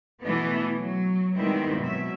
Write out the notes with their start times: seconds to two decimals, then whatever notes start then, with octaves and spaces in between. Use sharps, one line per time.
0.22 B2 E3 A3 B3
0.77 F#3
1.34 D#3 G3 G#3 B3 C4 E4
1.79 B2 F#3 E5